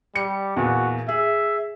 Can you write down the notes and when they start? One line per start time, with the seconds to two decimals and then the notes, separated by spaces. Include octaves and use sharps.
0.15 G3 C#7
0.57 E2 A#2 F#4
1.09 G#4 E5